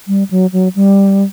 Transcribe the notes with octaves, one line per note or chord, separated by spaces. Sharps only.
G3
F#3
F#3
G3